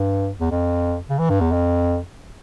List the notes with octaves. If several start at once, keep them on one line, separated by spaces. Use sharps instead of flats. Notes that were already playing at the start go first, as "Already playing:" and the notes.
Already playing: G2
E2
F2
C#3
E3
G2
E2
F2